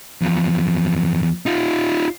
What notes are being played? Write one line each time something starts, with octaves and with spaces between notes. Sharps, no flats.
E2 F3
D#4 F4